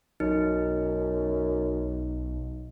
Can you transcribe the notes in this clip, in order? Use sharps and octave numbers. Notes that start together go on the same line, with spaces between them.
B1 F#2 D#4